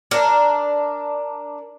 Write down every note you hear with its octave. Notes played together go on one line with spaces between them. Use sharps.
D4 A#4